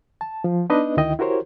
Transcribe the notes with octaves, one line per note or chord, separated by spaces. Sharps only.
A5
F3
B3 D4 D#4 B4 D#5
D2 D#3 E4 D#5 G5
E4 F#4 G4 A#4 C5 C#5